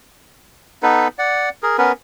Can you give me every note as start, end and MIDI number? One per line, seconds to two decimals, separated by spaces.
0.83 1.08 59
0.83 1.08 63
0.83 1.08 69
0.83 1.08 71
1.19 1.49 74
1.19 1.49 78
1.63 1.77 68
1.63 1.77 70
1.78 1.92 59
1.78 1.92 61
1.78 1.92 70
1.78 1.92 71